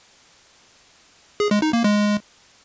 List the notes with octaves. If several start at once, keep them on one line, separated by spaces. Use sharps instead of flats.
G#4
G#3
D#4
A#3
G#3